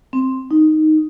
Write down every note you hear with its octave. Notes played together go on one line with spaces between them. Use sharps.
C4
D#4